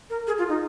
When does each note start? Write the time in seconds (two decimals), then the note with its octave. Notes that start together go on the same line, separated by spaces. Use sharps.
0.10 A#4
0.27 G#4
0.38 F4
0.49 D#4